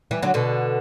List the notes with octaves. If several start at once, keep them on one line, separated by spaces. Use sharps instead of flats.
E3 G3
D3 F#3
B2 D3